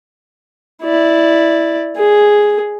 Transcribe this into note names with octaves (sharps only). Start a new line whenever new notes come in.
E4 D5
G#4